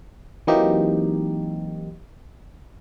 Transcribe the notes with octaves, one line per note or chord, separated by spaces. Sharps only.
E3 F#3 A#3 C4 D#4 G4